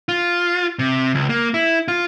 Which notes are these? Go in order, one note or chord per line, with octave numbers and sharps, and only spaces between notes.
F4
C3
C#2
A#3
E4
F4